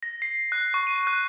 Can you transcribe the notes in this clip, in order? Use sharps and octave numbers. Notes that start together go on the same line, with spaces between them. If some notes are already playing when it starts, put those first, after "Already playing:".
A#6
C7
F#6
C#6
D#7
F#6